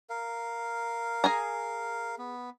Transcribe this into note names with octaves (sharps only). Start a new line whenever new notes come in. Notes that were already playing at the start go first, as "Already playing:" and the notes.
A#4 F5
G#4 G#5 A#5
B3